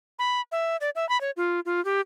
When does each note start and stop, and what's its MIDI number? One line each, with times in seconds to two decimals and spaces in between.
0.19 0.41 83
0.52 0.76 76
0.81 0.90 74
0.95 1.08 76
1.09 1.19 83
1.21 1.31 73
1.37 1.60 65
1.65 1.83 65
1.85 2.01 67